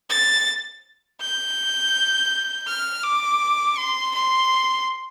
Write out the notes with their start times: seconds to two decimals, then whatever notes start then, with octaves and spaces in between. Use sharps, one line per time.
0.10 A6
1.20 G6
2.67 F6
3.04 D6
3.78 C6
4.15 C6